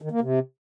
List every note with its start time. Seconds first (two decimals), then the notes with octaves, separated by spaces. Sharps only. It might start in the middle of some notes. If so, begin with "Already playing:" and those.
0.02 D#3
0.11 A#3
0.21 C3